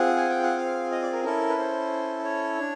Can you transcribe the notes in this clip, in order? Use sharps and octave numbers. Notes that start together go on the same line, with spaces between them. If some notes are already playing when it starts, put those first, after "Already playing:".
Already playing: C4 F4 G#4 F#5
G#5
G5
F#5
F5
D#5
D5
A#4
C#4 E4 A4 A#4
B4
C5
C#5
D4